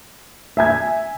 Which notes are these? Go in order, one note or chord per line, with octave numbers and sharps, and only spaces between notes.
E5 G#5 G#6